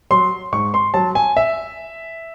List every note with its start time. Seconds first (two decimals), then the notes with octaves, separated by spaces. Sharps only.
0.11 F#3 C6
0.52 G#2 C#6
0.74 C6
0.94 F#3 A5
1.15 G#5
1.37 E5